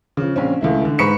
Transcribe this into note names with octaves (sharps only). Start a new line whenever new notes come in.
C#3 F3
A#1 C4 C#4
C#2 A3 E4
D3
G#2 B4 B5 C#6 C#7 E7